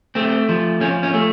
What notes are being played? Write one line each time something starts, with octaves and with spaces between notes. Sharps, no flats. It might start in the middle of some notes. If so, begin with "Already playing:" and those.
A3 C4
F3
F3 C#4
C#4
A3